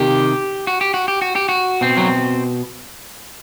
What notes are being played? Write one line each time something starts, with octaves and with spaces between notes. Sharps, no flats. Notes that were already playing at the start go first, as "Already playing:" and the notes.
Already playing: C3 D#3 G4
F#4
G4
F#4
G4
F#4
G4
F#4
B2 C4
F#3